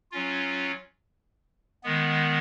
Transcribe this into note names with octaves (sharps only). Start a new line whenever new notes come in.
F#3 C#4 F4
D#3 G#3 B3